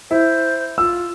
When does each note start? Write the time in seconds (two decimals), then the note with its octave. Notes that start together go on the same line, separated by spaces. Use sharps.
0.11 E4 C5
0.78 F4 E6